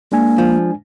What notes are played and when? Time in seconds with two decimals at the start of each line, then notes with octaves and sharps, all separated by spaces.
0.12 G#3 A#3 D4 G#5
0.38 F3